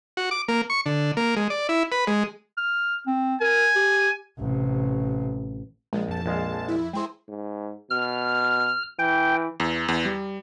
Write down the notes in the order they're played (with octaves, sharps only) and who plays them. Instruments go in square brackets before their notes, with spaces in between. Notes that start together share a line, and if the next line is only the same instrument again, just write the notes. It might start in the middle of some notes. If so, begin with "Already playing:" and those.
[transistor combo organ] F#4
D6
A#3
C#6
D3
A#3
G#3
D5
E4
B4
G#3
[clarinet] F6
C4
[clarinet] A#4 [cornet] G#5
[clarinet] G4
[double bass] A1 C3
[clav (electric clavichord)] A#1 [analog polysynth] G#3
[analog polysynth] F2 A5
[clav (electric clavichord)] A#1 G#3 F5
[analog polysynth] F2 E4
[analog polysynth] G#3 E4 G#4 [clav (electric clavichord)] C5 G5
[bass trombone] G#2
[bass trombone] B2 [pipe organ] F6
[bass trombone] E3 [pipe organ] G5
[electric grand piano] E2
E2
G3